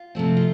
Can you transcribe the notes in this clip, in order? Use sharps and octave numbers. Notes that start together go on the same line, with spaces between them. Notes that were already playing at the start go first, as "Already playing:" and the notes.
Already playing: F4
C3 F3 A3 C4
F4